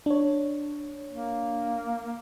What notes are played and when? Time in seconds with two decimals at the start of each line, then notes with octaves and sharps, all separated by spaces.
0.06 D4 C#5
1.10 A#3